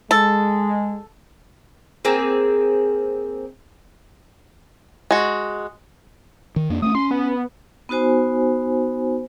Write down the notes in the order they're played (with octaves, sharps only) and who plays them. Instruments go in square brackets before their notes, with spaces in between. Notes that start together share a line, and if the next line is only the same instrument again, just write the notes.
[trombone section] G#3 [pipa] A4
[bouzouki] A#3 C4 G#4
[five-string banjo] G#3 F#4
[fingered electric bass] D#3
F2 A#3 D4
[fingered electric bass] A3 B3 C#4 [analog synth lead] D#6
[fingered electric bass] C#4 [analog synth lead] C6
[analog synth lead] B3
[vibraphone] B3 D#4 F#4 C5 G#5